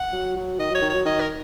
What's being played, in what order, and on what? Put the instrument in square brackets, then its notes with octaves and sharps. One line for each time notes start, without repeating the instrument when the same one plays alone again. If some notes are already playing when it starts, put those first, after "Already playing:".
Already playing: [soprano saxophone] F#5
[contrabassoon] F#3
F#3
[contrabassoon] D#3 [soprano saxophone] D#5
[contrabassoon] F#3 [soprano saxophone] C#5
[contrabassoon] D#3
[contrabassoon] F#3 [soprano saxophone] C#5
[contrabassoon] D#3 [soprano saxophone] D#5
[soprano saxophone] A#4